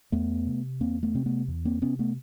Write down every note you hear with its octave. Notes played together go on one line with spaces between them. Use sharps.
E2 A3 B3
C3
E2 A#3 C4
A3 B3
C3 C4
A3 B3
E2
A#3 C4
C3 B3 C#4
A3 B3